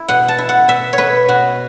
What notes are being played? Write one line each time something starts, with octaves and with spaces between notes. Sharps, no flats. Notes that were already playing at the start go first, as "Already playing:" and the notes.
Already playing: E4
B2 F#5
A5
E4
F#5
B2 E5
C#5
B2 B4
B2 F#4